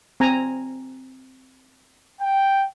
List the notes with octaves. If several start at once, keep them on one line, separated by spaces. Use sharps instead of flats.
C4 G#5 A#5
G5